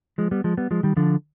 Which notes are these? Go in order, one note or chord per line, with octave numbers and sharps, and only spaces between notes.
F3 G#3
G3 B3
F3 G#3
G3 B3
F3 G#3
D#3 G3
D3 F3